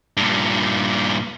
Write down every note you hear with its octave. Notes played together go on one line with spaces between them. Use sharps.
G2 A#2